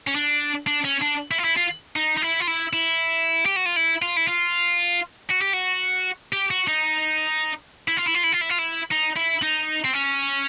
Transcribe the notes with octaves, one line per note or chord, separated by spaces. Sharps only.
C#4
D4
D4
C#4
D4
E4
F4
E4
F4
D#4
D#4
E4
F4
E4
E4
G4
F#4
F4
E4
F4
E4
F4
F#4
G4
F#4
G4
F#4
D#4
E4
F4
E4
F4
E4
F4
E4
F4
E4
D#4
E4
D#4
C4
C#4